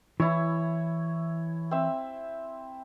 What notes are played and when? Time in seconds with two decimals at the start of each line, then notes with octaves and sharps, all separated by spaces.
0.20 E3 E4 C#5
1.71 C4 E5